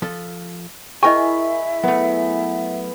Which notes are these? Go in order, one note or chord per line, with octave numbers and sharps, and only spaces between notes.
F3 A4
E4 G#4 A#4 D#5 E5 G5 G#5 C#6
F#3 A3 B3